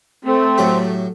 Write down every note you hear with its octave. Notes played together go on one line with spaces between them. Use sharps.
A3 C4
A2 F#3 G4